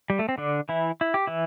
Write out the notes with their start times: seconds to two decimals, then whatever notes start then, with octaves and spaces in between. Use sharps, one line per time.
0.10 G3
0.19 A3
0.29 C4
0.38 D3 D4
0.69 E3 E4
1.01 E4
1.14 G4
1.27 E3 E4